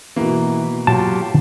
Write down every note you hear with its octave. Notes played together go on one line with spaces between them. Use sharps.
B2 E3 A#3
F#3 F4 G4 A5